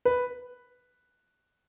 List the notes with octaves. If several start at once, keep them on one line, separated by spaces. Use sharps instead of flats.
B4